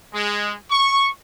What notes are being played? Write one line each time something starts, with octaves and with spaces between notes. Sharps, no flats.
G#3
C#6